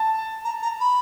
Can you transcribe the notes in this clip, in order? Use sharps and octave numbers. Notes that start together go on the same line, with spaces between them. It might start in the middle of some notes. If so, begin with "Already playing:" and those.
Already playing: A5
A#5
A#5
B5